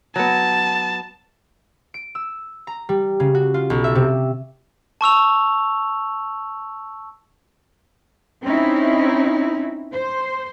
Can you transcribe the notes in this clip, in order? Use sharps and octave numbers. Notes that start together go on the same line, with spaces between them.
F#3 B3 A5
D7
E6
A#5
G3
C#3
F#4
F4
B1
E5
C3
A5 C#6 E6 F7
C4 C#4 D#4 E4
C5